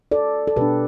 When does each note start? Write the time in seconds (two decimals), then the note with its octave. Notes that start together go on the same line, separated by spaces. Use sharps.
0.12 A4 D5
0.47 A4
0.56 B2 B3 D4 G4 B4